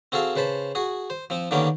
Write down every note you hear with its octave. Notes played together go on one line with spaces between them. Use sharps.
C4 F#4 G#4 A4 F5
C#3 B4 C5 A5 B5
F#4 G#4
C5
F3 C4
D3 D#3 A#3 B3 C#4 G4